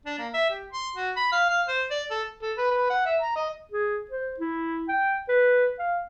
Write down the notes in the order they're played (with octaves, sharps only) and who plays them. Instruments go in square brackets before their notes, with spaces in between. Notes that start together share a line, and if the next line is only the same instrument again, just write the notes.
[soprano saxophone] D4
A#3
E5
G4
C6
F#4
B5
F5
F5
C5
D5
A4
[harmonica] A4
B4
B4
F#5
E5
A#5
D#5
[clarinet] G#4
C5
E4
G5
B4
F5